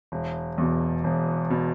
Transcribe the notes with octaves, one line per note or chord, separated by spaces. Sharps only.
E1
E2 B2
E1
B2